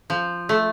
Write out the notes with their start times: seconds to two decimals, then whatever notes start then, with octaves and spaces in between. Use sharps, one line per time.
0.10 F3
0.49 A3